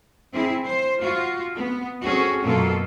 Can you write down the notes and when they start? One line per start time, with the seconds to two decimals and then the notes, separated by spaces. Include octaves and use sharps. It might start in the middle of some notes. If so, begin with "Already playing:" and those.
0.32 C4 E4 G#4
0.64 C5
1.00 F4 F#4
1.55 B3
2.04 C4 C#4 F#4 G#4 A4
2.43 F#2 B2 A#3 F4 A4